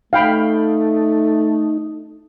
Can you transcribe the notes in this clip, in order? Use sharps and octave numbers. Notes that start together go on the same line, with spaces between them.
A3 D#4 F5 G5 B5